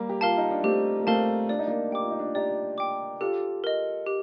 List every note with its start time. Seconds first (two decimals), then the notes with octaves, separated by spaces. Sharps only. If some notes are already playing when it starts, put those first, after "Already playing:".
Already playing: G3 A#3
0.09 G4
0.21 F4 A#4 F5 A5
0.37 D#4
0.51 D4
0.64 A3 C4 G4
1.00 A#3
1.07 A3 C4 A#4 F5 A5
1.49 D4 D5
1.59 D#4
1.67 A#3 D4
1.92 G4 G5 D6
2.01 F4
2.11 D#4
2.19 D4 F4
2.35 D#4 G4 D5
2.78 G5 D6
3.20 F4 G4 A4
3.64 A#4 D#5
4.07 G4